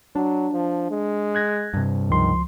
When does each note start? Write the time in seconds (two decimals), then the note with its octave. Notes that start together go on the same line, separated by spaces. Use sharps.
0.15 F#3 D4
0.53 F3
0.90 G#3
1.35 F#6 G#6 A#6
1.74 G2 C3
2.09 C#2 D#3 F3 C6